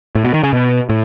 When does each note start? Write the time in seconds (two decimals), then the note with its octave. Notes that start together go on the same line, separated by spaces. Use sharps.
0.15 A2
0.24 B2
0.34 D#3
0.43 C#3
0.53 B2
0.89 A2